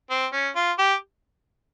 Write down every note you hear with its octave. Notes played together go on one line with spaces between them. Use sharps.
C4
C#4
F4
G4